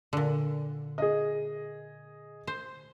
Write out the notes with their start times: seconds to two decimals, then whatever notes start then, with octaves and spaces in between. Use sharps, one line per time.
0.13 A#2 D3
0.98 G#4 D#5
2.47 C5